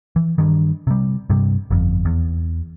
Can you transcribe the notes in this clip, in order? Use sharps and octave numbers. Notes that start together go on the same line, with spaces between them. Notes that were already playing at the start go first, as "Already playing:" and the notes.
E3
G2 D#3
C3 G3
G2 C3 G3
G1 F2
E2